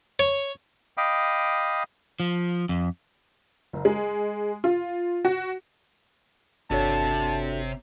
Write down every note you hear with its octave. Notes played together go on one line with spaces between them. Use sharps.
C#5
D#5 F5 G5 B5 D6 D#6
F3
F2
F#1
G#3
F4
F#4
G1 C3 D4 F#4 A4 C#5 A5